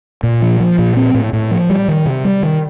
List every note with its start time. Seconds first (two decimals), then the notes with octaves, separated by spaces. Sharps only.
0.23 A#2
0.42 F3
0.60 F3
0.79 A#2
0.97 C4
1.14 A2
1.33 A2
1.51 F3
1.70 G3
1.88 D#3
2.06 C3
2.25 G3
2.43 D#3